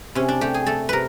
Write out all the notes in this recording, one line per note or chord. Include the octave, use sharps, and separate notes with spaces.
C3 C#4
D4
A3 G4
G#4
A3 A4
C3 A#4 B4